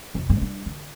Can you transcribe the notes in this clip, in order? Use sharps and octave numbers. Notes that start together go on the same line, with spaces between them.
C2 F2
G2 D3
G3 D4
D3